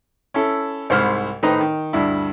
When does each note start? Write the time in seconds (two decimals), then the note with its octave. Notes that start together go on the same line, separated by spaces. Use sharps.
0.34 C#4 E4 A4
0.90 C2 G#2 C5 B5 F6
1.43 A2 D#3 D#4 B4 C5 A#5
1.61 D#3
1.93 D2 G2 E4